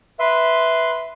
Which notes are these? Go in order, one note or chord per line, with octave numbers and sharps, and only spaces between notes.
B4 E5 C6